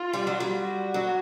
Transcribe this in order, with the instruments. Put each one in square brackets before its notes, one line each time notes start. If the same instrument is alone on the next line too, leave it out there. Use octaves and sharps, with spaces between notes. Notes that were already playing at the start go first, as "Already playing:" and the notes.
Already playing: [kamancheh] F4
[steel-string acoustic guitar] G3
F#3
G3
[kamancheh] F#4
[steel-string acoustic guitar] F#3